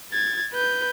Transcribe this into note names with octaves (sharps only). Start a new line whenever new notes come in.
G#6 A6
B4 G6